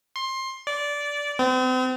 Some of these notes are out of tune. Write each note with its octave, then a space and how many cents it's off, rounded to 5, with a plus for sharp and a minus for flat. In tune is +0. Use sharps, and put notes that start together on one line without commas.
C6 +20
D5 -15
C4 -40